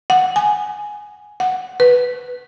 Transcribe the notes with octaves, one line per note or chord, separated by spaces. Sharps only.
F#5
G#5
F#5
B4